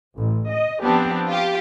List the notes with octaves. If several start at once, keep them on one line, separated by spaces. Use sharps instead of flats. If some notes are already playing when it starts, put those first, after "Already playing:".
A1
D#5
F3 B3 C4 D4 G4
F4 G4